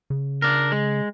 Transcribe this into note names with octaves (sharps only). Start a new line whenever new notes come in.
C#3
D4 A#4
G#3